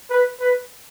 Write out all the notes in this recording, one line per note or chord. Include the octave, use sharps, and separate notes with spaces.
B4
B4